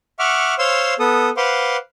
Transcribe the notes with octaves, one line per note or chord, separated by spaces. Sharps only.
E5 F#5 C#6 D6 F6
C5 C#5 F5 C6 E6
B3 A4 D#6
B4 C5 F5 F#5 C6 D6